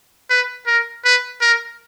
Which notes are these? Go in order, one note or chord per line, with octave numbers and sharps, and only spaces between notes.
B4
A#4
B4
A#4